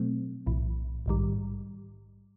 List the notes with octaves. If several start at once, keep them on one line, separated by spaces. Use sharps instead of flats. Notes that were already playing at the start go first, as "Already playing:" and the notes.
Already playing: B2 F#3 A3 C4
B1 A2 E3
A#1 G#2 D#3 G3